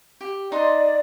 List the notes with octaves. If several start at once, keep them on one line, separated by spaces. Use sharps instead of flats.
G4
D#4 D5 D#5 C6